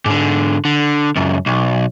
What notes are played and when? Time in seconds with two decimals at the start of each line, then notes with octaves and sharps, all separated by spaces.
0.05 G#2 D3
0.65 D3
1.16 C#2 F#2
1.46 B1